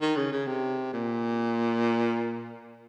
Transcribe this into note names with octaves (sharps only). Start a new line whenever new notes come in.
D#3
C#3
C#3
C3
A#2